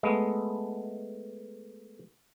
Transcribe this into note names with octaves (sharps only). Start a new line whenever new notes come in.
G#3 A3 B3